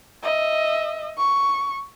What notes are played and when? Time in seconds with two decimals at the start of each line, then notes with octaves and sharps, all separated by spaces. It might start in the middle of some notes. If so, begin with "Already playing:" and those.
0.23 D#5 E5
1.18 C#6